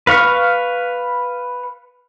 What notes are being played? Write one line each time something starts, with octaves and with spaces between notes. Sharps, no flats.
B4 F5 C#6